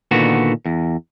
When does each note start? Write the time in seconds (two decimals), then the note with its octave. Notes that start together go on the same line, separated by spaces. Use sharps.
0.11 A#2 D3 D#3 B3 F#4
0.66 E2